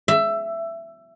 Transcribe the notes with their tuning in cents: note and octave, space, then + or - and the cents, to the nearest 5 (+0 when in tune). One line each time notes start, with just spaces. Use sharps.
E5 +15